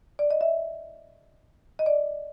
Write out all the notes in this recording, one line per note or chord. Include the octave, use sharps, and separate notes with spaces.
D5
D#5
E5
D#5
D5